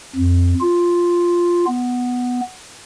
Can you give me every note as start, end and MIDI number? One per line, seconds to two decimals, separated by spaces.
0.16 0.54 41
0.61 1.65 65
1.67 2.41 59